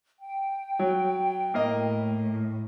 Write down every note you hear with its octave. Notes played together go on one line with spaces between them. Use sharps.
G5
F#3
A2 A#3 A#4 D#5